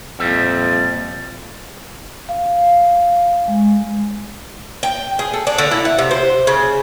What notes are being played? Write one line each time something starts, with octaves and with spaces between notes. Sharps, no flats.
F2 A#2 G3 E5
F5
G#3
G5
G#4
A4
D4
D3
E4
F#5
C3
C5
C#3